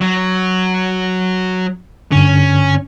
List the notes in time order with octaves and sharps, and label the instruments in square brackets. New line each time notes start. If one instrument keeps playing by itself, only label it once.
[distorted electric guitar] F#3
[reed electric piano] G2 D3 [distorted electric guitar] C#4